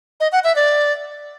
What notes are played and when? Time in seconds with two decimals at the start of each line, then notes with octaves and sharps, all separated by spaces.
0.20 D#5
0.32 F#5
0.44 E5
0.56 D5